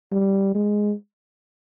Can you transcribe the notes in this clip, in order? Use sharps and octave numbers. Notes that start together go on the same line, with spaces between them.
G3
G#3